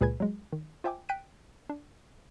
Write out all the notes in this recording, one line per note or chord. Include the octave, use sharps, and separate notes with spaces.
C#2 A#2 G#4 B4 G#5 G#6
F#3 G#3
D#3
F4 C5 E5 G5 G#5 D6
G5 F#6 B6 D7 D#7
D4